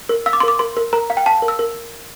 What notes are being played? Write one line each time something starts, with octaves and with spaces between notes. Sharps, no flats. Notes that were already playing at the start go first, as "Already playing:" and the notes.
A#4
F5 E6
D6
C6
A#4 D6
A#4 C6
A#4
A#4 A#5
F5
G5
F5 A5
A#4
E6
A#4